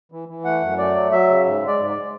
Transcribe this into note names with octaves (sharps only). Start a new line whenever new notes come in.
E3
E3
A3 F#5
F#2
A3 D5
F#3
F#3 E5
C#3
G#2
G#3
D5
G#2
D5
G#3